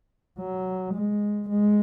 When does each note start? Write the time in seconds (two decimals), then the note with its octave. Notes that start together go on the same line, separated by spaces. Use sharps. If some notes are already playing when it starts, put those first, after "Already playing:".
0.39 F#3
0.94 G#3
1.49 G#3